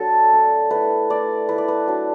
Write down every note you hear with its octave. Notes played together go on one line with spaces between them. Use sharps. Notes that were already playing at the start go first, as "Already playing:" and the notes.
Already playing: F#3 D4 A4
A3 D4
A3 E4 B4
A3 E4 D5
A3 E4 B4
D5
B4
F#3 D4